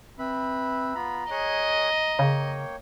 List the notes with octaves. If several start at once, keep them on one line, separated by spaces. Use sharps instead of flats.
C4 B4 E5 B5
B3 F4 A#5 B5
G#4 C#5 D#5 F#6
C#3 A#3 C#5 G5